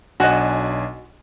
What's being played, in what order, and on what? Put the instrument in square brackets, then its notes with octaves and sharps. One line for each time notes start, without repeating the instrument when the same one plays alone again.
[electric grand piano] B1 D4 G#5 [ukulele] F#4 D#5